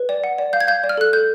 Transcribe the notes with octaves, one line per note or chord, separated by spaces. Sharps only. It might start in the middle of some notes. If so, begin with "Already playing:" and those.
Already playing: B4
D5
F#5
D5
F5 G6
G#6
F5 G6
D5
F6
A4 F#6
A4 G6